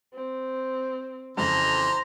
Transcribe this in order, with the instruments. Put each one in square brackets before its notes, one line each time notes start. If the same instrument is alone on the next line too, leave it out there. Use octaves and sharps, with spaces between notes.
[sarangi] C4
[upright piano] F2 C#3 [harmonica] E3 C5 [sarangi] A#5